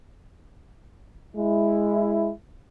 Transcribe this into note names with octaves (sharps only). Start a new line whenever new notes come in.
G#3 E4